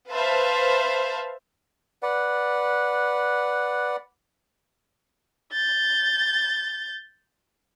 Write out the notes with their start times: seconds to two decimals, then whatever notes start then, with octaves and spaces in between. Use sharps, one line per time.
0.11 B4 C5 E5 F5 A5
2.03 B4 D5 F#5
5.53 G6 A6